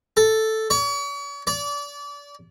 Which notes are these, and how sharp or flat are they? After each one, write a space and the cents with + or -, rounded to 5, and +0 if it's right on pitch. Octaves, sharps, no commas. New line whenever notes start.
A4 +0
C#5 +40
D5 -30